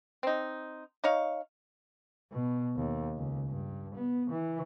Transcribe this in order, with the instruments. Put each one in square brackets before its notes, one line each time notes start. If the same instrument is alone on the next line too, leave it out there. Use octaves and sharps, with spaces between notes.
[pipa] C4 D#4
D#4 C#5 F5
[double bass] B2
D#2
C#2
G2
B3
E3